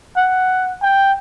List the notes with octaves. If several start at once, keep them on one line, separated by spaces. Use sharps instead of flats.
F#5
G5